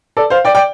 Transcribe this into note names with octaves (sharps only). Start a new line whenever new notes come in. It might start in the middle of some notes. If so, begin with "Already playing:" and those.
A4 D5
C5 F5
D5 G5
D5 G5